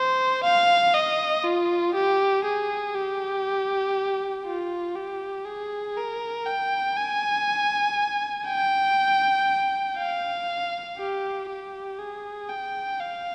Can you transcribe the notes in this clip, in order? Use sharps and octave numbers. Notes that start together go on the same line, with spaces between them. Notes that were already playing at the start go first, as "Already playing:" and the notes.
Already playing: C5
F5
D#5
F4
G4
G#4
G4
F4
G4
G#4
A#4
G5
G#5
G5
F5
G4
G4
G#4
G5
F5